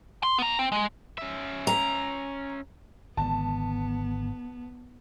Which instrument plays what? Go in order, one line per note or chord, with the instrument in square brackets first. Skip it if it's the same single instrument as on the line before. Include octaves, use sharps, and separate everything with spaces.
[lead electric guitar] C6
B3 A#5
C4
G#3
[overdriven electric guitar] C#4 E5
[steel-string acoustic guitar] A#5
[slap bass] G#1 D3 [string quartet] B3 [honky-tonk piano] A5